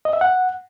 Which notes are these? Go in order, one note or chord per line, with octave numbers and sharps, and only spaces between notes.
D#5
E5
F#5